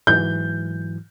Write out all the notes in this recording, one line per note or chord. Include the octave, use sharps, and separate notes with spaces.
G#2 E3 F#3 G6